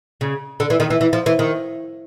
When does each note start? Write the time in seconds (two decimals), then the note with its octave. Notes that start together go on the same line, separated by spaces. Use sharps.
0.21 C#3
0.60 D3
0.70 E3
0.80 D#3
0.90 E3
1.01 E3
1.13 F3
1.26 E3
1.39 D#3